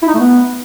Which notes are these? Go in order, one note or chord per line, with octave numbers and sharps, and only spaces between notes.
E4
D#4
A3
B3